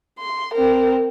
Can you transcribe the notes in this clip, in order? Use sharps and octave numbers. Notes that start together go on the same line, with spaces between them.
C6
C4 A#4